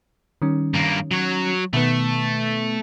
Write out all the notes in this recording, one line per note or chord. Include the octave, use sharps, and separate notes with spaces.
D#3 G3 C#4
G2 A#3
F#3 C#5
B2 D#3 A3 B3